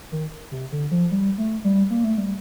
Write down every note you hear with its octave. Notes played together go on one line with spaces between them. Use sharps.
D#3
C3
D3
F3
G3
A3
G3
A#3
A3
G3